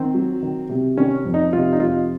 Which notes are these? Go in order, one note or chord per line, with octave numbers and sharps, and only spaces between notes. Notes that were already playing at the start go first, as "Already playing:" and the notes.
Already playing: D#3 C4
F#3
D#3
C3
D#3 C#4
F2
D#4
C3 F4
D#4
F2 F4